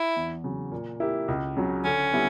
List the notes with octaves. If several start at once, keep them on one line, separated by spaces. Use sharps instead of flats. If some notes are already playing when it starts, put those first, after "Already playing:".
Already playing: E4
E2
C#3 F#3
A#2
A#3 E4 G4
C#2
C#3 F#3
D3 C#4
G3 B3 E4 G4